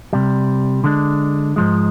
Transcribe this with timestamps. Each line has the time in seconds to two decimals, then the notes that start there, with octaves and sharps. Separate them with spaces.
0.13 C2 C3 G3
0.84 D3 G#3 D4
1.56 G#2 F3 G#3